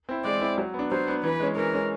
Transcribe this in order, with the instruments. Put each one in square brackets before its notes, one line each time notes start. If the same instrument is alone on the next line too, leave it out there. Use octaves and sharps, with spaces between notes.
[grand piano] C4 E4
[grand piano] G#3 [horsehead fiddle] D5
[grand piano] C4 E4
F#3
B3
D4
[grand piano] F#3 [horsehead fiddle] C5
[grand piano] B3 D4
[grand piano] E3 [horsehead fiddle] B4
[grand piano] G#3 C#4
[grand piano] E3 [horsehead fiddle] A#4
[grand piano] G#3 C#4